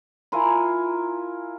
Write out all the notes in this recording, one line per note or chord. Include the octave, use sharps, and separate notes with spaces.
E4 F4 A#4 G#5